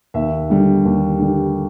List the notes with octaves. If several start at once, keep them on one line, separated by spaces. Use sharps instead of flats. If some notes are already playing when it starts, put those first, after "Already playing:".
D#2 E5
D3 G3
D#2
D3 G3